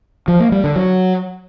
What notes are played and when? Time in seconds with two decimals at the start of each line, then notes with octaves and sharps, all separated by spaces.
0.28 F3
0.40 A#3
0.52 G3
0.64 D3
0.76 F#3